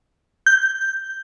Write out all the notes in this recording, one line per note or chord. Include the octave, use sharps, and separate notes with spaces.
G6